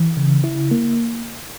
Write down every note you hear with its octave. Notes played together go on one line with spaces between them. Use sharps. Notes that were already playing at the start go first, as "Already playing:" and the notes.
Already playing: E3
C#3
E4
A#3